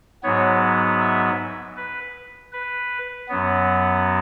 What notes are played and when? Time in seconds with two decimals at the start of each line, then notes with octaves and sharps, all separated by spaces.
0.23 G#2 F#3 B3 C#5
1.00 E5
1.76 B4
2.52 B4
3.29 F#2 F#3 B3